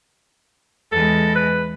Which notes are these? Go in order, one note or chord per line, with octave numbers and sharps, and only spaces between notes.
E2 G#3 A4
B4